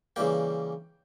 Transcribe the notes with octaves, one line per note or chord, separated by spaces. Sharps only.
C#3 E3 G3 A#3 G5